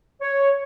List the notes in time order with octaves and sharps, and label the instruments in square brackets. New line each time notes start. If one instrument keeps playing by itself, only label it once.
[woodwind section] C#5